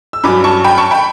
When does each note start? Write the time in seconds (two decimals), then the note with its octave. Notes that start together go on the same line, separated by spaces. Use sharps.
0.13 E6
0.24 G2 F#3 C#4 B5 D6
0.44 A5 C#6
0.64 G5 B5
0.78 A5 C#6
0.91 G5 B5